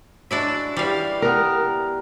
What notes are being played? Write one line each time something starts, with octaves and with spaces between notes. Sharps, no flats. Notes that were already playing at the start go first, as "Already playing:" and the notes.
F#3 G#3 D4 E4 E5
E3 G3 G4 D5 F5
B3 A#4